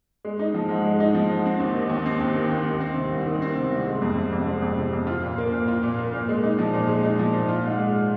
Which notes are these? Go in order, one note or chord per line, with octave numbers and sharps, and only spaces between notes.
G#3
D#4
F3
G#2
G#3
D#4
F3
G#2
C4
D#2
D#3
D#2
C4
D#2
D#3
D#2
D#3
C4
C3
C2
D#3
C4
C3
C2
G#3
F2
C3
F2
G#3
F2
C3
F2
F4
A#2
A#3
A#2
F4
A#2
A#3
A#2
G#3
D#4
F3
A#2
G#3
D#4
F3
A#2
F4
G#2
G#3